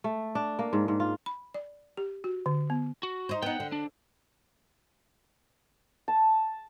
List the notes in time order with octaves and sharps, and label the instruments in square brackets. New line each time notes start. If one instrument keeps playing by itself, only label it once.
[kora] A3
D4
A#3
G#2
G#2
F4
[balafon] B5
D5
G4
F#4
D3
B3
[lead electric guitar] F#4
[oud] D#4 C5
[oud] B3 D#4 [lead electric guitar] F#5 G5
[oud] D3
[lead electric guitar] D4
[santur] A5